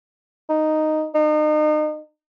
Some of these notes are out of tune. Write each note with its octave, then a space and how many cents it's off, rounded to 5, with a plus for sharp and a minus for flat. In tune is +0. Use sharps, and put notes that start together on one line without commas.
D#4 -5
D#4 -35